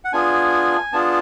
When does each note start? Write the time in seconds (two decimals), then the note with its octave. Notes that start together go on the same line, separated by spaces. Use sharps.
0.04 F#5
0.13 B3 D4 F4 G#4 G#5
0.92 B3 D4 F4 G#4 A5